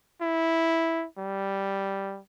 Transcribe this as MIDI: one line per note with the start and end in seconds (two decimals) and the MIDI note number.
0.21 1.06 64
1.18 2.20 55